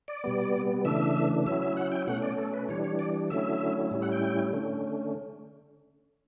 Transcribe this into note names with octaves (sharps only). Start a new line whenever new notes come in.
D5
B2 G3 B3
C#3 E3 A3 D4 E5
F#3 C#4 E4 E5
E5
F#5
G5
B2 A3 C#4 F#5
D5
A4
B4
E3 G3 D4 C#5
C#5
D5
D3 F#3 A3 C#4 E4 E5
A2 G3 C#4 E4
F#5
G5
D3 A3 C#4